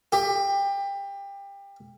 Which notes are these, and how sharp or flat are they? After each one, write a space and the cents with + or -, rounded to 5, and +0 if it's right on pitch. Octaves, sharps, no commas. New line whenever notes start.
G4 +25